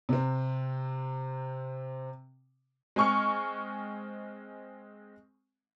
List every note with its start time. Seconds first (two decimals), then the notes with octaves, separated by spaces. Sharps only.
0.09 C3 C4
2.96 G#3 C4 G#5 C#6 F6 C#7